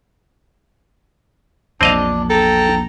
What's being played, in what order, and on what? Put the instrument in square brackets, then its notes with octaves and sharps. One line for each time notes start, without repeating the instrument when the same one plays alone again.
[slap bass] A#1 E2 [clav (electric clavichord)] C4 D#5 F5 [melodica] D4
[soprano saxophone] A4 [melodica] G5 A#5